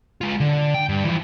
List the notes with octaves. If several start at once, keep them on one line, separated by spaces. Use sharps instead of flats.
G#3 F4
D3
G5
G2
E3 F3